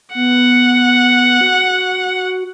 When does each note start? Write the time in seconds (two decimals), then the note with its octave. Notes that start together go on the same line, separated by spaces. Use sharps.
0.15 B3 F#5
1.41 F#4